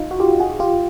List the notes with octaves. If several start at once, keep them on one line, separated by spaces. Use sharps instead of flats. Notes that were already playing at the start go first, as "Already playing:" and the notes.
Already playing: D#4 F4
F#4
F4 G4
F#4 G#4
F4 G4